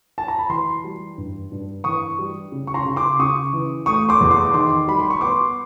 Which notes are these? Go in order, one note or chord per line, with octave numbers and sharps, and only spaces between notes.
A5
A#5
B5
E3 A#5 C6
G3
G2
G2
E3 C#6 D#6
G3
C#3
C#6
A#5 C6
C#3
C6 D6
C#3 C#6 D#6
E3
A3 C#6 D#6
C6 D6
E2
C6 D6
D#3 C6 D6
G3 B5
C6
C#6
B3 C6 D6